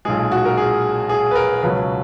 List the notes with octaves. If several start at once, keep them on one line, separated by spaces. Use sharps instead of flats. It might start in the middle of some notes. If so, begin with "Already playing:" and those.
B1 A#2 G#3 G#4
F#4
A#4
G#4
G#4
B4
A#4
C#2 B2 F#3 B4